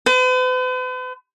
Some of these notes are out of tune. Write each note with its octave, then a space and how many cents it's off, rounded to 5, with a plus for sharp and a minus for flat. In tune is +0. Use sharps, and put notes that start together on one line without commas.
B4 +45